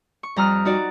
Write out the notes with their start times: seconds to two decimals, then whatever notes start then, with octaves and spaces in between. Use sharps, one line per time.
0.23 C#6
0.36 F2 G3 A#5 D#6 F6 F#6
0.65 D#4 F#4 D5